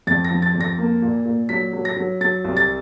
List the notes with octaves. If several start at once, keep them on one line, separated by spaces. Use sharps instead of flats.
F2 A6
A#6
F3
A6
F2
A#6
A#3
A#2
A#2
F#3 B6
F#3
A#6
F#3
F#3 A6
C2
A6